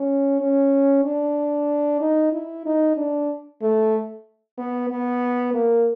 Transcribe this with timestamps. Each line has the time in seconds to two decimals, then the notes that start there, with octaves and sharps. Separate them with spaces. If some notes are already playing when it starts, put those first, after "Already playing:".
Already playing: C#4
0.40 C#4
1.04 D4
2.01 D#4
2.33 E4
2.66 D#4
2.97 D4
3.62 A3
4.58 B3
4.90 B3
5.54 A#3